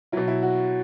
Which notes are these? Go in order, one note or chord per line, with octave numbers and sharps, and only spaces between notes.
B2 F#3 E4
E4
F#4